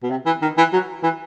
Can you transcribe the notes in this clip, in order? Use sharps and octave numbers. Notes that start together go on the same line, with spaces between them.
B2
C3
E3
D#3
E3
F#3
E3